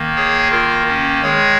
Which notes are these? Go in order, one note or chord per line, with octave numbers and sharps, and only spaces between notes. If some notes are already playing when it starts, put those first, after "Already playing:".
Already playing: D#3 A#3
G#4 C#5
F4 A#4
C#4
D#3 G#3 G#4 C#5